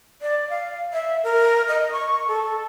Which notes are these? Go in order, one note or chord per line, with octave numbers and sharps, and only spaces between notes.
D5
F5
E5
A#4
D#5
C#6
A4